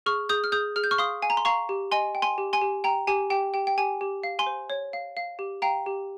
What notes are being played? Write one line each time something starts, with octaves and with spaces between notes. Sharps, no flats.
G#4 C#6 F6
G#4 D#6 G6
F6
G#4 D#6 G6
G#4 F6
G6
C#6 F6
F5 C6 D#6
F5 G#5
A#5
C6
F5 A#5 C#6
G4
D#5 G#5 C6
G5
G#5 C6
G4
G#5 C6
G4
G5 A#5
G4 G#5
G4 G5
G4 G5
G5
G4 G#5
G4
F5
G#5 C6
C5
C#5
F5
F5
G4
F5 G5 A#5
G4